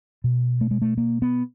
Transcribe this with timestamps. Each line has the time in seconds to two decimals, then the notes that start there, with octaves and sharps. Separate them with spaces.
0.24 B2
0.61 A3
0.71 G#3
0.82 A3
0.98 A#3
1.22 B3